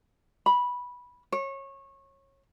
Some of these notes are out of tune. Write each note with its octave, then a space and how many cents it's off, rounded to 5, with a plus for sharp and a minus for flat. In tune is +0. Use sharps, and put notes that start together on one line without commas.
B5 -10
C#5 -25